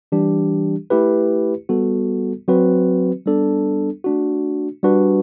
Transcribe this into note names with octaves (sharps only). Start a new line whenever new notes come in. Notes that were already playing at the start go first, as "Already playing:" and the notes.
E3 G3 D4 G4
A3 E4 G4 B4
G3 B3 F#4 A4
F#3 C4 F#4 B4
G3 B3 D4 A4
A3 D4 F#4
G3 D4 F#4 B4